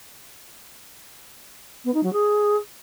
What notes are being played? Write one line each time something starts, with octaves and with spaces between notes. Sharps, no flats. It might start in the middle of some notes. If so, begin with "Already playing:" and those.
B3
D#4
F#3
G#4